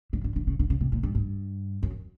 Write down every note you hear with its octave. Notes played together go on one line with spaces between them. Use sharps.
D3
D3
D3
C#3
D3
C#3
C3
A#2
G2
G2
F#2